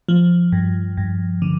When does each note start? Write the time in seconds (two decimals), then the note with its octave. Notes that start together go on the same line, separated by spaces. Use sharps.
0.09 F3
0.52 G2
0.97 G2
1.42 D3